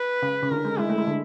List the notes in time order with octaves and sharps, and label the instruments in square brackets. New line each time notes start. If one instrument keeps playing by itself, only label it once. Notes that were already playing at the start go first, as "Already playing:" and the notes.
Already playing: [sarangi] B4
[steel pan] C#3
C#3
[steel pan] D3 [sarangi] A#4
[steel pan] G#3
[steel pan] G#3 [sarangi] E4
[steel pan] A3
G#3
D3